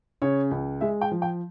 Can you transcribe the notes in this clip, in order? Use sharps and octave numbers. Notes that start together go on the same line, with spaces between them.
C#3 C#5
C#2
G#3 E5
G5
F3
G5